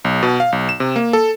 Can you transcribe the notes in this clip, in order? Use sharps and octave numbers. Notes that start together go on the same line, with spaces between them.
B1
B2
F5
B1
E7
C3
A#3
A4